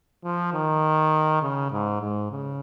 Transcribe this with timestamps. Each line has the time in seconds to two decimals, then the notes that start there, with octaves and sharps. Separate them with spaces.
0.24 F3
0.53 D#3
1.42 C#3
1.71 G#2
2.01 G#2
2.31 C#3